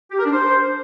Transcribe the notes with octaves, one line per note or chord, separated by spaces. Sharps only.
G4
A#4
D4
C5